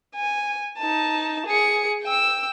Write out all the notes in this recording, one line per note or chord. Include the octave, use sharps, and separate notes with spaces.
G#5
D#4 A5
G#4 C#7
G5 E6